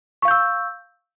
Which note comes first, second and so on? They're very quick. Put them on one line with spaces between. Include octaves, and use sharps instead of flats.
C#6 F5 G6 E6